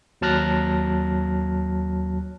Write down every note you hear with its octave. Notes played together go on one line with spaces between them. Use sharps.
D#2 F#3 A5 F6 F#6 A#6